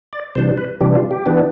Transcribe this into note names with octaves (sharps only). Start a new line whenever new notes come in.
D5
C3 E3 G3 D4 C5
B4
C3 E3 G3 D4 G4
F4
G4
E3 B3 D4